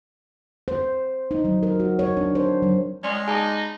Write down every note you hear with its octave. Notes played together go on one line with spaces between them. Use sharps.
C5
D#4
F#3
A#4
F#4
C#5
D4
C5
F#3
G#3 C#4 D5 C6
D#4 G#4 G#5 A5 D6